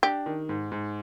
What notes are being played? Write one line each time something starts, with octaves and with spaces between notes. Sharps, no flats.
D4 G4
D#3
G#2
G#2